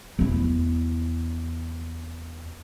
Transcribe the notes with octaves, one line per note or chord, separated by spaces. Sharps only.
E2 E4